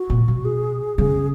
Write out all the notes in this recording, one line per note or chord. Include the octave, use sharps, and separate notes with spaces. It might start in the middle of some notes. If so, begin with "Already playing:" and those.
Already playing: F#4
A#2
B2
G#4
C#3 G#4